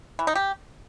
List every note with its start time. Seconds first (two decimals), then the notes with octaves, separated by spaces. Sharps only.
0.19 E3
0.27 D#4
0.35 G4